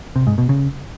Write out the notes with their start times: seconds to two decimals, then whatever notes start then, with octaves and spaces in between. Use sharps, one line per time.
0.16 C3
0.27 G#2
0.38 B2
0.49 C#3